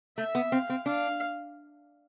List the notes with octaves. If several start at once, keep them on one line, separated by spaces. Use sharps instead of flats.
A3 E5
B3
C4 F5
C4
D4 F5